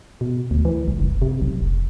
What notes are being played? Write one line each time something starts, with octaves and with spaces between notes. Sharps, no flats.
B2
D2
E3
C2
F#1
C3
B1
F1